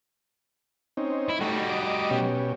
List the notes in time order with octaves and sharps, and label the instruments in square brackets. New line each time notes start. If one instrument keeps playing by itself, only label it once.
[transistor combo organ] C4 C#4 D#4
[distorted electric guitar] E4
[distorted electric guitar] G3 F#4 [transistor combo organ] A3 D#4
[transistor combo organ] D#5 D6
B2 C#4 G4